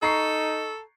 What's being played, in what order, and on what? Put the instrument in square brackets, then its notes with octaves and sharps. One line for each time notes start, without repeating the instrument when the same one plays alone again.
[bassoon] D#4 [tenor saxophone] A4 [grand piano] A#5 C#6 C7